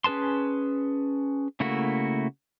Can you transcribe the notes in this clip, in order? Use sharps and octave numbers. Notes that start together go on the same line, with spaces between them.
C#4 G#4 B4 A5 C6
C#3 A3 A#3 E4 F#4